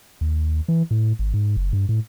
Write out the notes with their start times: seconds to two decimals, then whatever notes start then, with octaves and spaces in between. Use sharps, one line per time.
0.21 D#2
0.68 E3
0.91 A2
1.19 G#1
1.34 G#2
1.56 F#1
1.73 G2
1.89 A2